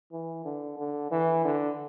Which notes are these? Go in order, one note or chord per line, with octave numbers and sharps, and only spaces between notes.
E3
D3
D3
E3
D3